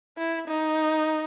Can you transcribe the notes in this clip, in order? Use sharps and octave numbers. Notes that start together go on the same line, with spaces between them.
E4
D#4